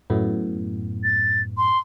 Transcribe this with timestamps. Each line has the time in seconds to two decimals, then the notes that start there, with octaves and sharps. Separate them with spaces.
0.10 F#2 A2 B3
1.04 A6
1.57 C6